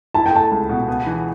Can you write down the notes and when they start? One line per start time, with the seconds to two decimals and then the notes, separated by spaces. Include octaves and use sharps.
0.14 E4 A5
0.26 G5
0.32 A3 A5
0.51 C#2
0.69 B2
0.88 B3
1.06 E3